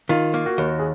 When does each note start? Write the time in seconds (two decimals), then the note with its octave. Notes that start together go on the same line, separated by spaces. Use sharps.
0.09 D#3 F4
0.34 A#3
0.46 F#4
0.58 D#2
0.79 G#4